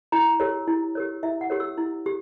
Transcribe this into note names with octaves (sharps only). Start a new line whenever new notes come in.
E4 A#5
G4 A#4 C#5
E4
G4 A#4 C#5
E4 E5
F#5
G4 A#4 C#5
E6
E4
G4